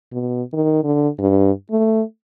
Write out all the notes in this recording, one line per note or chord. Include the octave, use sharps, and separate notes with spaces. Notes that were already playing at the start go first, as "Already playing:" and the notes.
B2
D#3
D3
G2
A3